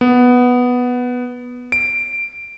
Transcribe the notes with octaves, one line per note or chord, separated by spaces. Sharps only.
B3
D7